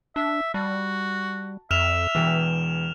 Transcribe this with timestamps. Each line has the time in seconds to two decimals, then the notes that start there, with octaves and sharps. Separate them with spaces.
0.16 D4 E5
0.54 G3 F#4 A5
1.71 F2 E5 F6 E7 F7
2.15 E1 E2 E3 G5